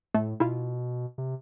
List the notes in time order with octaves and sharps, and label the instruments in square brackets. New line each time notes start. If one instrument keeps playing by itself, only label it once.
[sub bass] A2 [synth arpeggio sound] A3
[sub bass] B2 [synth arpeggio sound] E4 F4
[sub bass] C3